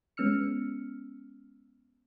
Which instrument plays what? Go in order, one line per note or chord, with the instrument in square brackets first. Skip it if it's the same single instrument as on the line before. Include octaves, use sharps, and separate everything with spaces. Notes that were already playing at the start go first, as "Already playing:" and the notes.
[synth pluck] G#3 B3 C#4 E6 F6 C#7